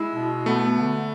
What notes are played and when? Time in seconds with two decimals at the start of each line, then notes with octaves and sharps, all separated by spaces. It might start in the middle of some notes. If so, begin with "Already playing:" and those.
Already playing: G#3 E4
0.15 B2
0.46 A3 B3
0.77 D3